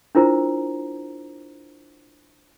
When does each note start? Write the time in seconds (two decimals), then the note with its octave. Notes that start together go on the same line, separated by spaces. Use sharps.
0.15 D4 E4 F4 A#4 C5 A#5